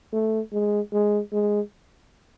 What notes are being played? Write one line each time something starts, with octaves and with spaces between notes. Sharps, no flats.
A3
G#3
G#3
G#3